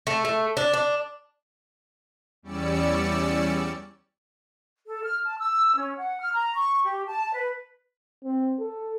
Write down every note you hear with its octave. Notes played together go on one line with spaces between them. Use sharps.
A3
A3
D4
D4
E2 G3 C#4 D5 E6 C#7
A4
F6
A5
E6
C#4
F#5
F6
A#5
C#6
G4
A5
B4
C4
A4